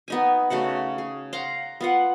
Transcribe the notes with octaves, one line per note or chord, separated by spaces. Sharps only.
B3 D#4 G#5
C#3 A3 F#4 F#5
G#4
F5 F#5 A#5 C6
B3 F4 F#5